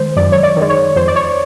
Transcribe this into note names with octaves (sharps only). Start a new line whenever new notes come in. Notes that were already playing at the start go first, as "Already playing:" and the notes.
Already playing: D#3 G#3 C5
F#2 D5
C#5
D5
D#3 G#3
C#5
F2 C5
D5
C#5